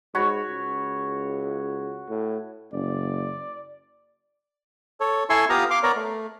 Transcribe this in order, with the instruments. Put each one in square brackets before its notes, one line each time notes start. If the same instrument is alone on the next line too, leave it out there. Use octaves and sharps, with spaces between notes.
[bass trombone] G#2 [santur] F#4 C#5 B5
[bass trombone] C#2
A2
[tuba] F#1 [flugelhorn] D5
[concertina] A4 C#5
E4 A4 G#5 C6 C#6 E6
B3 F4 G4 F5 A#5 D#6
F5 C6 D6
B3 A#4 C#5 D5 A#5
A3